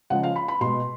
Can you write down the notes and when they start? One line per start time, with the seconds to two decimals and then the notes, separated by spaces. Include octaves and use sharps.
0.10 C#3 F3 G#3 F#5
0.23 F5
0.36 B5
0.48 B5
0.61 B2 G#3 C6